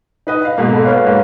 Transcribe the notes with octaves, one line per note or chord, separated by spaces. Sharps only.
D#4 B4 D#5
F5
G#2 B2 A#3
A4 B5
B4 C#5 F5
G#2 A#3